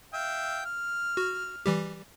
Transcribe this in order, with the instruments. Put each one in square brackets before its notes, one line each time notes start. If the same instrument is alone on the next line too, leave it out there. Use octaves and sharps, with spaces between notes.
[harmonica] E5 F5 G5
F6
[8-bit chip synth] F#4
E3 G3 G4